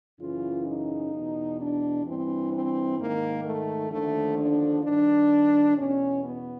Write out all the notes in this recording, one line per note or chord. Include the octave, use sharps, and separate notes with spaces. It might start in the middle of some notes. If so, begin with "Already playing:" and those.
F#2 C#3 E3 F4
D#4
E2 B2
D4
G2 E3 C4
C4
G#2 D#3 A#3
A3
D#2 D3 F3 A3
D4
G2 D#3 D4
E2 B2 C#4
B3